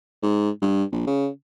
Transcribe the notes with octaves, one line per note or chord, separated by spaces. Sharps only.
G#2
G2
A#1
C#3